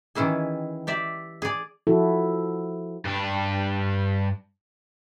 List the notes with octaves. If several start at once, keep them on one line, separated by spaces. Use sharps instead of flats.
D#3 E3 C#4 E4 G#4
G4 D5 E5
G#4 D5
F3 E4 F#4 A4
G2 D4